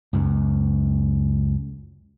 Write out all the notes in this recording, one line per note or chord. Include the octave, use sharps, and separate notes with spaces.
C#2 F#2